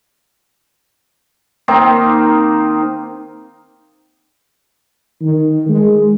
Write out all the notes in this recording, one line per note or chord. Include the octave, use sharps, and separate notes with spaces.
D#3 A#3 C4 D#4
D#3
G#3